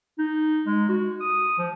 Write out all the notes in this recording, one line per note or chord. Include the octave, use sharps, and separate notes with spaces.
D#4
G#3
F#4
D#6
F3